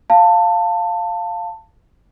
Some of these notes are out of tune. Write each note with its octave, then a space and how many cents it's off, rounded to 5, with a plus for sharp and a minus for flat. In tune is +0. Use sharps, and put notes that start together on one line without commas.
F5 +0 A5 +20